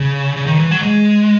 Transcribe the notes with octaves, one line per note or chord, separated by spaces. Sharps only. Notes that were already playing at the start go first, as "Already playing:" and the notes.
Already playing: C#3
C#3
D#3
E3
F#3
G#3